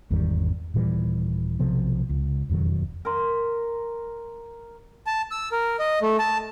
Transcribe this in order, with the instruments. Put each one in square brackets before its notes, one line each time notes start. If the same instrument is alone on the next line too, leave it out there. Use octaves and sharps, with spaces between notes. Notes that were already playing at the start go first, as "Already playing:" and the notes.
[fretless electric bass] G#1 E2 D#3 G3
D#1 A#2 E3 G3
B1 C3 F3 B3
C#2
E1 F2 D#3 F#3
[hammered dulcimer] A#4 C6
[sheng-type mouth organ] A5
E6
A#4
D#5
A3
A5